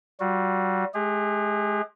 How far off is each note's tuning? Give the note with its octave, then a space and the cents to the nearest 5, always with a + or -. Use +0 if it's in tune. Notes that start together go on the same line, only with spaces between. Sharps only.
G3 -35 F#4 -35
G#3 +35 G#4 -45